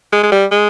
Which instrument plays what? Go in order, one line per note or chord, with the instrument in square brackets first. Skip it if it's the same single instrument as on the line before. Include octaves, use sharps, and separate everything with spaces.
[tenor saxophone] G#3
G#3
G3
G#3